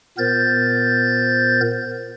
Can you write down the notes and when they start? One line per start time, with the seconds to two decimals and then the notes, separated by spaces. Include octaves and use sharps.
0.18 A#2 B3 A#4 C5 G6 A6